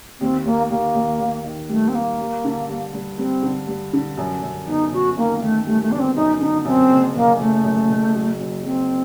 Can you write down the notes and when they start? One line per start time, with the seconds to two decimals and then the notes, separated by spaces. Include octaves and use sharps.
0.20 D#2 C4
0.45 D#2 A#3
0.70 D#2 A#3
0.95 D#2
1.19 D#2
1.44 D#3
1.69 G3 A3
1.88 C4
1.94 G3 A#3
2.19 G2
2.45 D3
2.68 G2
2.93 G2
3.18 G2 C4
3.43 D3
3.67 G2
3.93 D3
4.18 F#2
4.43 F#2
4.67 G1 D#4
4.93 F#2 F#4
5.17 D#3 A#3
5.41 D#3 A3
5.66 G3 A3
5.82 A3
5.91 G1 D4
5.99 C4
6.16 F#2 D#4
6.41 D3 D#4
6.65 F#2 C4
6.90 F#1
7.15 F#1 A#3
7.41 F#1 A3
7.65 F#2
7.90 F#1
8.15 F#3
8.40 F#3
8.64 F#3 C4